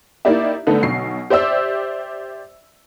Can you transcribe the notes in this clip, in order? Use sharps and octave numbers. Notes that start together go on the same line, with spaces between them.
A#3 D#4 E4 G4 D5 E5
D3 A3 B3 D#4 A4 B4
B1 B2 C7
G4 C5 D5 E5 E6